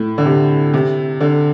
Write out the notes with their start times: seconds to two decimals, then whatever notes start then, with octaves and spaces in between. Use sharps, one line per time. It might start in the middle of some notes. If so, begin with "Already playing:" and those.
Already playing: A2
0.18 D3
0.25 C3
0.74 C3
1.21 D3